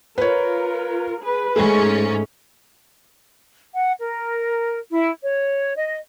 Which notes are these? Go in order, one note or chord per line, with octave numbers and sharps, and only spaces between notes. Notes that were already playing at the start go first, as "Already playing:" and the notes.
F4 A#4 B4 C#5
G#4 B4
G#2 A3 C#4 G#4
F#5
A#4
E4
C#5
D#5